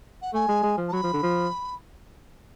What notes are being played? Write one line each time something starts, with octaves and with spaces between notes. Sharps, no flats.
F#5
A3 G#5
G#3
G#3
F3
A5
F#3 B5
F3
D3
F3